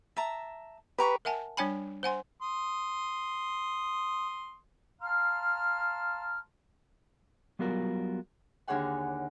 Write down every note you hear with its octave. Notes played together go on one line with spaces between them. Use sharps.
E5 A5 A#5
G4 B4 A#5 C#6
A#4 E5 F#5 G#5 A5
G3 D4 C#5 G5 G#5 B5
C5 F#5 G#5 C6
C6 D#6
F5 A5 A#5 C6 F6
F#3 G3 B3 F4 F#4 A#4
D#2 D3 G#4 C#5 F#5 G#5